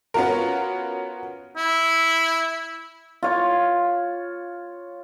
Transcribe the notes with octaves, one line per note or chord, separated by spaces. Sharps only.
B3 C#4 F4 F#4 A#4
E4
F4 C#5